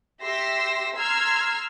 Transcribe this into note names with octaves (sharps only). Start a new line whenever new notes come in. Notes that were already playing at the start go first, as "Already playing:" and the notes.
G4 E5 C6 E6 A#6
A#5 C6 E6 F6 G#6